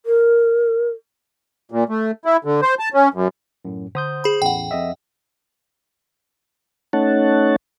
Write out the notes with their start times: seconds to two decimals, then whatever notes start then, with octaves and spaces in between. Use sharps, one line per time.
0.06 A#4
1.72 A#2
1.89 A3
2.25 E4
2.45 D3
2.62 C5
2.79 A5
2.94 C#4
3.14 F#2
3.65 F#2 A2
3.95 D3 C5 D#6 G6
4.24 G#4 B5
4.42 A1 E2 F#5 G5
4.71 F2 D#5 E5
6.93 A3 C#4 D#4 C#5 F#5 A5